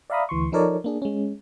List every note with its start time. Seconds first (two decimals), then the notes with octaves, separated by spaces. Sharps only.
0.10 D5 E5 F5 A#5 B5 D#6
0.29 D2 E3 C6 C#6
0.52 F3 D#4 A4 A#4 C#5 D5
0.84 A#3 D4 G#4
1.02 G#3 C#4